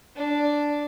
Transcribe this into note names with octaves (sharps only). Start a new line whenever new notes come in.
D4